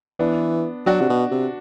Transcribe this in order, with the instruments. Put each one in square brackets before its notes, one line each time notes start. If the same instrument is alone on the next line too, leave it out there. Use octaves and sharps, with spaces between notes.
[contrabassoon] E3 [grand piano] B3 D4
[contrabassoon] F#3 [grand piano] D4 F#4
[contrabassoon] C3
B2
C3